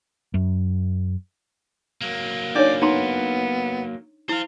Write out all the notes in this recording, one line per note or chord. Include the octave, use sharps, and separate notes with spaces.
F#2
F#3 A#3
D4 D#4 C#5 D5
B3 D#4 A#5 C6
E4 C5 F5